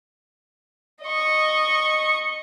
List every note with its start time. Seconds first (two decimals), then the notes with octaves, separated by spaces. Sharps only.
1.03 D#5 C#6